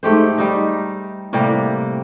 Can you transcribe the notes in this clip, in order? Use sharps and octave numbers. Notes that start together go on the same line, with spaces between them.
G#2 A3 G4 C5
G3 D#4
A2 C3 G3 A#3